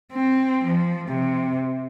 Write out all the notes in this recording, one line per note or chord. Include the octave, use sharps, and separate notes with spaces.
C4
F3
C3